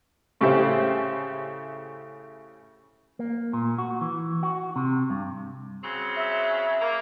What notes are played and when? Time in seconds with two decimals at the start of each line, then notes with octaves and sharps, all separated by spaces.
0.41 A2 C#3 A3 G4 C5 E5
3.19 A#3
3.53 A#2
3.78 F#4
4.01 E3
4.43 F#4
4.76 C3
5.10 G2
5.82 C#3 F#3 C4
6.17 E5
6.80 A#3